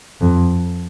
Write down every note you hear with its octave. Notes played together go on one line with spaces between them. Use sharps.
F2